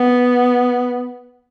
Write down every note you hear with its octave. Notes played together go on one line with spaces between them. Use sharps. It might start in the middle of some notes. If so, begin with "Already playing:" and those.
Already playing: B3